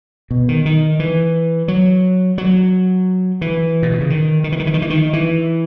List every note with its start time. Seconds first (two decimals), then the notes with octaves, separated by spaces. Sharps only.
0.31 B2
0.49 D#3
0.66 D#3
0.99 E3
1.68 F#3
2.38 F#3
3.41 E3
3.83 A#2
3.92 B2
4.01 C#3
4.10 D#3
4.44 D#3
4.52 E3
4.59 D#3
4.67 E3
4.74 D#3
4.82 E3
4.90 D#3
5.13 E3